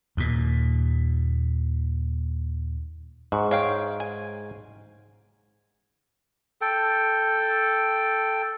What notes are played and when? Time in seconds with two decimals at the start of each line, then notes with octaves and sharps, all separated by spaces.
0.17 D#2 A#2
3.32 G#2 F#4
3.51 C#5 F5 G5
4.00 G#5
6.62 A4 G5